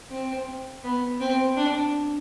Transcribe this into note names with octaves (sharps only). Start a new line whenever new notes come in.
C4
B3
C4
D4